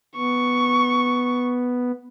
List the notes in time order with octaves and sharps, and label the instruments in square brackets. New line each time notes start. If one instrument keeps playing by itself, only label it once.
[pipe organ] B3 [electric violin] C#6